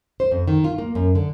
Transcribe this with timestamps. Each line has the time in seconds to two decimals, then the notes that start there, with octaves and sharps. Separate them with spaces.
0.20 C5
0.31 F2
0.48 D#3
0.64 F4
0.78 A#3
0.95 F#2
1.15 D3